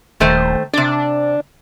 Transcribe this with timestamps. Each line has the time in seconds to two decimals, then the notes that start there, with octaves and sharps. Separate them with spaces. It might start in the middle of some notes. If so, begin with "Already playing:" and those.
0.20 D#1 D#3 A3 C5
0.73 C3 D4 D5